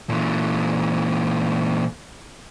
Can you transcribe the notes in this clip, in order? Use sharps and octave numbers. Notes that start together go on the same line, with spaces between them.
A#2 E3